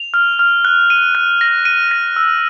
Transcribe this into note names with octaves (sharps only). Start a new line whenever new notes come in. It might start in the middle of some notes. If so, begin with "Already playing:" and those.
Already playing: F7
F6
F6
F#6
D#7
F#6
A#6
D#7
A#6
E6